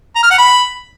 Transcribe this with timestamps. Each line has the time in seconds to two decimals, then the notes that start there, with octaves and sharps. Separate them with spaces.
0.15 A#5
0.23 F6
0.31 F#5
0.38 B5